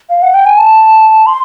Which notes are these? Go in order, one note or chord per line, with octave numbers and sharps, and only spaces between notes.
F5
F#5
G5
G#5
A5
C6